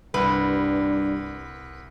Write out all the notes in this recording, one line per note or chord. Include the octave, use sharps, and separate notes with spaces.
C2 G2 B4